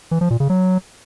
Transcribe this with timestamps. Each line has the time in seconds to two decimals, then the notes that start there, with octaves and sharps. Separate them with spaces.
0.11 E3
0.21 F3
0.30 A#2
0.40 C#3
0.49 F#3